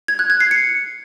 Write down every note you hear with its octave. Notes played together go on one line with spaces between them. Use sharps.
G#6
F#6
G#6
C7
C#7